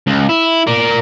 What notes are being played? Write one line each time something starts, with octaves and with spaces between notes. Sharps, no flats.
C#2
E4
A#4 D5